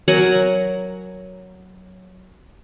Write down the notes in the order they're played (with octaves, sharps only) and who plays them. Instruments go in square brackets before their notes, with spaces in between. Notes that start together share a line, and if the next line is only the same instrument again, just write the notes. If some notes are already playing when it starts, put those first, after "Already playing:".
[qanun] F#3 A#4 F#5 G#5